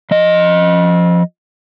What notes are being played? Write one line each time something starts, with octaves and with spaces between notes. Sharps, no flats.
F3 D#5